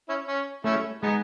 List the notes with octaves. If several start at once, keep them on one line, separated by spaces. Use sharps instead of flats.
C#4 E4
C#4
A3 C#4 E4
G#3 B3 D#4